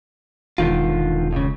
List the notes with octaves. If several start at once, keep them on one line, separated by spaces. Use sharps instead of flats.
E1 D3 D#3 F4
C#2 C#3